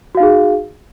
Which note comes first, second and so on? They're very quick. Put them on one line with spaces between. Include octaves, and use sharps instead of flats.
F#4 F5 D#4 G#4